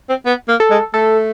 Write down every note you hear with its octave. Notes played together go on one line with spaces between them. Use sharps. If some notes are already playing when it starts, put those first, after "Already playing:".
C4
B3
A#3
A4
G#3
A3 A4